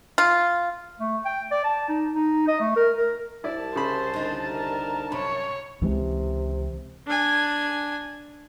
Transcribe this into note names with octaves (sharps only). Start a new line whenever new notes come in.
F4
A3
G5
D5
A5
D#4
D#4
D#5
A3
A#4
A#4
C2 E4 D5 A5
C#3 C5 B5
D3 D#4
A#4
F#2 C3 C#5 B5
C#2 C3 E3 G#3
D4 G#5